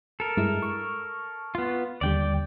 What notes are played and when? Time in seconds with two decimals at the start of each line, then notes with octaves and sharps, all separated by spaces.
0.20 A4 A#4
0.37 G2 G#3 E4
0.62 C#6
1.55 B3 F4
2.01 D#2 D3 G3 D5 G5